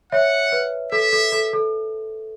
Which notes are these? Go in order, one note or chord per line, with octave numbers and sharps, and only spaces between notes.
C#5 E5 F#5
B4
A4 E5
A4
A4
A4